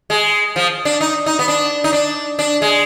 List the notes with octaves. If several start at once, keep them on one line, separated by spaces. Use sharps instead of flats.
G#3
F3
D4
D#4
D#4
B3
D4
D#4
D4
D4
G#3